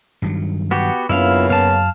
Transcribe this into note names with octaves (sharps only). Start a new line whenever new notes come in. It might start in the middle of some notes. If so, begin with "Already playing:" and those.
G2 D#3 F#3
B3 F#4 G4
F#2 C#3 A#3 B3 D4 E4 F4 F5
F#2 F5 A5